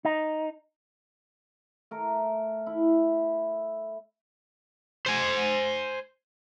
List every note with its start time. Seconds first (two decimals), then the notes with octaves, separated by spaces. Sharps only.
0.05 D#4
1.91 A3 A#4
2.66 E4
5.06 C5 G#5